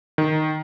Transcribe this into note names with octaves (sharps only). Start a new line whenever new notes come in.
D#3